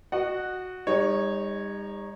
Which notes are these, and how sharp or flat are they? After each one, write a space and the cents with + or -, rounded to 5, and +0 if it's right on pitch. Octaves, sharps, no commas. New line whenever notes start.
F#4 -5 D#5 -35 F#5 +0
G3 +40 D#4 +0 C#5 -10